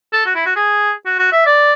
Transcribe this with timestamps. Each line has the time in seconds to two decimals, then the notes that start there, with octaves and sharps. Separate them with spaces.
0.13 A4
0.26 F#4
0.35 E4
0.46 F#4
0.56 G#4
1.06 F#4
1.19 F#4
1.32 E5
1.46 D5